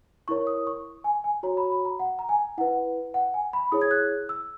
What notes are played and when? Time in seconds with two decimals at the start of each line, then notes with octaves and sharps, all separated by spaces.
0.28 E4 A#4 C#5 C#6
0.47 D#6
0.67 C#6
1.04 G#5
1.24 G#5
1.43 F#4 C#5 A#5
1.57 B5
1.72 B5
1.85 A#5
2.00 F#5
2.19 A#5
2.29 G#5
2.58 E4 B4 F#5
3.14 F#5
3.34 G#5
3.53 B5
3.72 E4 G#4 C#5 D#6
3.82 G#6
3.91 F#6
4.29 E6